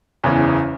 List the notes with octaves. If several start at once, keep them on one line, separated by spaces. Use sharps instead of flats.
F#1 E2 C#3 E3